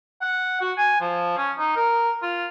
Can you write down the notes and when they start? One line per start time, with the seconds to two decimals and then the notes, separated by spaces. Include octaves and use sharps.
0.22 F#5
0.61 F#4
0.78 G#5
1.01 F3
1.37 C#4
1.58 D#4
1.76 A#4
2.22 F4